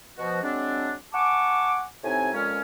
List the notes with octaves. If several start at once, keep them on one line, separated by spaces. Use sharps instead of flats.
B2 F3 F#4
F#3 G#3 C4 D4
F#5 G#5 A5 C#6 D6
A2 C3 C4 D#4 G#5
F2 A#2 G#3 C#4